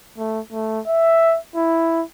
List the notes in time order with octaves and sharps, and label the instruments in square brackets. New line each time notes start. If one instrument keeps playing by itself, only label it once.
[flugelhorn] A3
A3
E5
E4